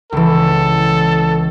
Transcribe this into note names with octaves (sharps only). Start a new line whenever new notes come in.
C#2 E3 A4